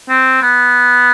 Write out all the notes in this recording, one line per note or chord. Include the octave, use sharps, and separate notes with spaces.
C4
B3